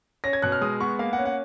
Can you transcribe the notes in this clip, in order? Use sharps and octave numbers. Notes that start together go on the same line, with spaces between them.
C#4 A#6
G#6
B2 F#6
F6
G#3 D#6
B3 C#6
A#3 F5
F#5
C#4
F#5